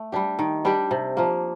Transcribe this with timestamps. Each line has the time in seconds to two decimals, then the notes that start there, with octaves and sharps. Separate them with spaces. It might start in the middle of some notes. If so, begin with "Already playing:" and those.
Already playing: A3
0.12 G3 D4 G4
0.39 D#3
0.65 G3 D4 G4
0.91 C3
1.17 F3 A#3